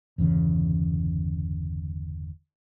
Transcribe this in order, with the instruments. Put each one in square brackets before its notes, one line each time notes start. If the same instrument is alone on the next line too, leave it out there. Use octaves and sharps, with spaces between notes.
[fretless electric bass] G1 E2 C#3 E3